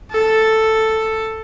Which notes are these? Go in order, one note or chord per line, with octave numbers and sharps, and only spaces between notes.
A4